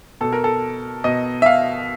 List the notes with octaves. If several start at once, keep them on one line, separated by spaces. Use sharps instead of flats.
B2 A4
A#4
A4
B2 D#5
E5
F5